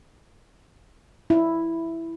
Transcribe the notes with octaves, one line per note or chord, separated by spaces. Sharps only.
E4